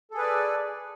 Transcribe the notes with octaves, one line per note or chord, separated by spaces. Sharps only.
G#4 A4 B4 D5